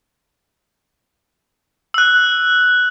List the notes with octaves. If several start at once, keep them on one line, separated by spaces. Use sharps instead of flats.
E6 F#6